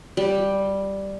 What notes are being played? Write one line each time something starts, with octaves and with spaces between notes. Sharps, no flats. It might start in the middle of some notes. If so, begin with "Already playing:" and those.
G3